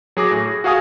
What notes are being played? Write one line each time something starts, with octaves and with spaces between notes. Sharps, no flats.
F#3 G#4 D6 A#6
A2
G#4
F#4 G#4 F5 G#5 D#6